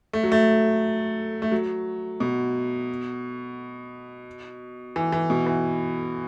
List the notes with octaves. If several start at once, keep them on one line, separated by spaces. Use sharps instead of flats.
A3
F#3
A3
A3
F#3
B2
E3
E3
B2
E3